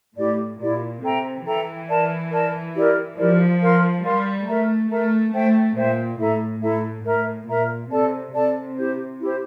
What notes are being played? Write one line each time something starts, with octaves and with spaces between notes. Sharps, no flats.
A2 E4 G4 D5
A#2 E4 G4 D5
C3 A4 E5 G5 A#5
E3 A4 E5 G5 A#5
A#4 D5 A5
A#4 D5 A5
E4 G4 A#4 D5
F3 E4 G4 A#4 D5
A#4 F5 C6
G3 A#4 F5 C6
A3 A#4 E5 A#5
A3 A#4 E5 A#5
A3 C5 E5 G5
A#2 C5 E5 G5
A2 E4 A4 E5 A#5
A2 E4 A4 E5 A#5
A2 A#4 E5 A#5
A#2 A#4 E5 A#5
C3 A4 D5 A5
C3 A4 D5 A5
E4 G4 C5
E4 G4 C5